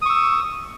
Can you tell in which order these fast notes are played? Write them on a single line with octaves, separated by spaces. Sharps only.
D#6 C#6 E6